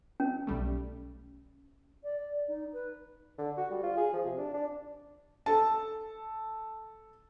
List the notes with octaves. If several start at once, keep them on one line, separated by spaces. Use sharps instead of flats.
C#4
B1 G3 A3
D5
D#4
B4
D3
F#4
G3
F4
G#4
F3
C3
D4
D4
A4 A5